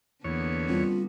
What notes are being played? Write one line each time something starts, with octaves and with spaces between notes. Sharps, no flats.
E2 D3 A#3 B3 C#5
G3 C4 F4